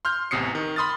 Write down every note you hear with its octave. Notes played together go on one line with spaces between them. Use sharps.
C6 F6 G6
A1 E2 C3 D#6 C7 C#7
D#3
B5 C6 D#6 F6 A6